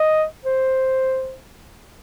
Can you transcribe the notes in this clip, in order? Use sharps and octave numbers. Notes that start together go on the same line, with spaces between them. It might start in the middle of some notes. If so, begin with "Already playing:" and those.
Already playing: D#5
C5